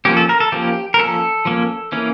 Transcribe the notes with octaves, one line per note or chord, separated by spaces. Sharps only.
F3 A#3 C#4 G4
A4
A#4
A4
F3 A#3 C#4 G4
A#4
F3 A#3 C#4 A4
F3 A#3 C#4
E3 A#3 C#4